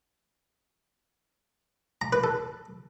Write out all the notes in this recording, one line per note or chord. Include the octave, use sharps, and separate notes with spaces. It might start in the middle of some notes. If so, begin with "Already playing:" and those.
A#5
B4
A4